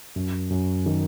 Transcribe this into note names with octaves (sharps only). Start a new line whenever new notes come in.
F#2
F#2
D#3